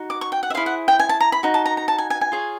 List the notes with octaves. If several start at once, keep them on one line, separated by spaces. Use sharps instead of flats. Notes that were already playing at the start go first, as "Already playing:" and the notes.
Already playing: D#4 F#4
D6
C#6
G5
F#5
E5
E4 G#4 C5 F5
F#5
G5
G#5
A5
A#5
B5
D#4 F#4
A5
A#5
A#5
A5
G#5
G#5
G#5
F4 G#4 C#5